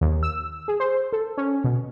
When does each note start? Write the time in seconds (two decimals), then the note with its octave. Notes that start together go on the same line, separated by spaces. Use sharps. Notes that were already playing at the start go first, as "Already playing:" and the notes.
0.01 D#2
0.23 E6
0.68 G#4
0.80 C5
1.13 A4
1.37 C#4
1.64 B2